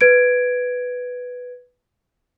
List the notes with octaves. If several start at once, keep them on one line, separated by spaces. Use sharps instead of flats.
B4 G#6 D7